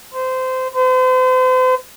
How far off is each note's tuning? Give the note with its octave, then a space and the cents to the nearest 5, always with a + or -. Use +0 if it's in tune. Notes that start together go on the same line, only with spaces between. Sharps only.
C5 -20
C5 -40